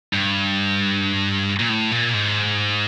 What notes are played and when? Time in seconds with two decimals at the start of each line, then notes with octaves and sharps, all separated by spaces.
0.13 G2
1.59 A#2
1.69 A2
1.91 A#2
2.14 G#2